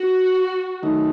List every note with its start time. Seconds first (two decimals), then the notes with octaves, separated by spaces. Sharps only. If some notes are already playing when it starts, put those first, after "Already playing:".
Already playing: F#4
0.83 D#3 F#3 A3 D#4